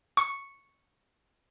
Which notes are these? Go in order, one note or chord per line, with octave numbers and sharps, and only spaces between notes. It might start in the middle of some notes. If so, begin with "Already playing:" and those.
C#6